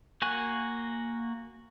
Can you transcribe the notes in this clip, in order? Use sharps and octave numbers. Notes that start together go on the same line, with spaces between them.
A#3 F#4 G#5 C#6 F#6